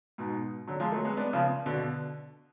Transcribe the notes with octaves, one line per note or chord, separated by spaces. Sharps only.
G#2 B2
D3 F#3
F3 G#3
F#3 A3
G#3 B3
B3 D4
C#3 F3
B2 D3